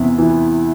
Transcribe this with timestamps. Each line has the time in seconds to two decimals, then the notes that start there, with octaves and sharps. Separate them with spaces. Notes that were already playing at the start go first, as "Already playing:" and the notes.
Already playing: E2 C3
0.18 E3